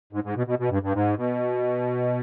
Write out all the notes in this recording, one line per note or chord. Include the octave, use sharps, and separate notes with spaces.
G#2
G#2
B2
B2
B2
G2
G2
G#2
B2